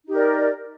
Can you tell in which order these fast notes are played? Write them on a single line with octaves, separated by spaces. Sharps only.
D#4 G4 A#4 D5